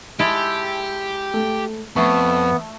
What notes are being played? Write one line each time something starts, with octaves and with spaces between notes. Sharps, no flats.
G#3 E4 G4 A4
A3
F2 A3 B3 C#6